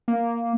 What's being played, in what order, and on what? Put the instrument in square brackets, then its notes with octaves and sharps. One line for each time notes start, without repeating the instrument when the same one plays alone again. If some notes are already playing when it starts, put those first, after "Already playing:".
[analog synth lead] A#3